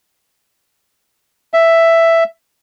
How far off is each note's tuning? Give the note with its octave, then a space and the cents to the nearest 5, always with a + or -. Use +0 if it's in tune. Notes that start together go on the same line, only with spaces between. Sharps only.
E5 +5